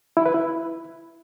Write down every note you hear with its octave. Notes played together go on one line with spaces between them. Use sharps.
E4
B4
E4